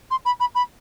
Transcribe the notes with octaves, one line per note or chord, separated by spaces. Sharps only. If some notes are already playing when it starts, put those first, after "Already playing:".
C6
B5
B5
B5